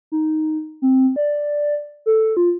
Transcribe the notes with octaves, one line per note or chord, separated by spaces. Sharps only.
D#4
C4
D5
A4
F4